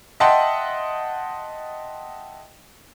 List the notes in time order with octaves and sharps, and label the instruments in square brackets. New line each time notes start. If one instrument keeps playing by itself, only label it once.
[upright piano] D#5 E5 F#5 G5 A5 C6